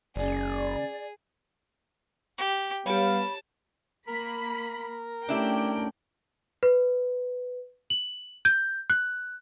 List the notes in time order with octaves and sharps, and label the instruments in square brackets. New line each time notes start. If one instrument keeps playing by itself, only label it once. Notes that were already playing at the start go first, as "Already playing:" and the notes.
[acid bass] F#1 [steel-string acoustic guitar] D#2 C#3 [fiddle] G#4 [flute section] D5
[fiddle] G4
[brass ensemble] G3 B3 F5 [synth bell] G4 C#5 [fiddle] A5 [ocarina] B5
[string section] A#3 B5 B6 [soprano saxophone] A#4
[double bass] A3 C#4 [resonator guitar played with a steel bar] D4 E4 G4 [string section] G5
[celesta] B4
F#7
G6
F#6